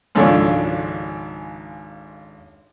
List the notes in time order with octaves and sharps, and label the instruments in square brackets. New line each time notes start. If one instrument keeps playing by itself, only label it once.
[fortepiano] G#1 C#2 F3 D4 A4 C#5